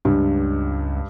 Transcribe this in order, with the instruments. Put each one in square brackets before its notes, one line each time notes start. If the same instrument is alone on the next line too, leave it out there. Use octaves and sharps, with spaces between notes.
[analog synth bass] C#2 [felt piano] G2